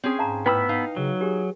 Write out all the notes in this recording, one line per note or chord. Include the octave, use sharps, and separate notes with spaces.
C4 C#4 G#4
G#2 F5 A5 A#5
A2 B3 E4 B4 G5 B5 E6
D#4 F5
C#3 F#3
G4 G#4